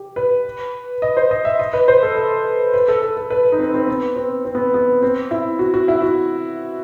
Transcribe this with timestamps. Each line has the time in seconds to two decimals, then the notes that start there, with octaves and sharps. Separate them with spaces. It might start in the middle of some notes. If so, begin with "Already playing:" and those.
Already playing: G4
0.16 B4
1.02 D#5
1.17 C5
1.31 D#5
1.45 E5
1.59 D#5
1.73 B4
1.88 C5
2.03 A4
2.16 A4
2.74 B4
2.88 A4
3.02 A4
3.17 A4
3.30 B4
3.52 D#4
3.59 C4
3.74 C4
3.87 B3
4.16 C4
4.45 C4
4.55 B3
4.74 B3
5.02 C4
5.31 E4
5.59 F#4
5.74 F#4
5.88 E4
6.02 F#4